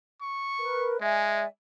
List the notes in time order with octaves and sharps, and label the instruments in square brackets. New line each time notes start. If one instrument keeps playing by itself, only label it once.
[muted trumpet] C#6
[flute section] A#4 B4
[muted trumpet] G#3 [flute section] D5 E5 G#5